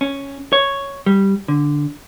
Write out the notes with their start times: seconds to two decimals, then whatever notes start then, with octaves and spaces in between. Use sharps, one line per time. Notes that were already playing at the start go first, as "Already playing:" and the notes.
0.01 C#4
0.53 C#5
1.06 G3
1.48 D3